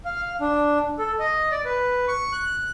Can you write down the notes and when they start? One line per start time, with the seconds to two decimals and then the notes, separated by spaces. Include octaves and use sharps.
0.05 F5
0.41 D4
0.99 A4
1.19 D#5
1.51 D5
1.65 B4
2.08 C#6
2.32 F#6